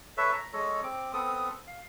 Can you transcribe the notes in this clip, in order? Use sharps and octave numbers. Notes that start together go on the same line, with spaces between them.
A4 B4 C#5 E5
A#5
G#3 A4 C#5 D#5
C4 D6
B3 C4 A4 D#6
F5